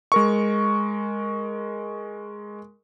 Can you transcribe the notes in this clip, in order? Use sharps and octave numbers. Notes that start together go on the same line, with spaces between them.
G#3 A#4 C#6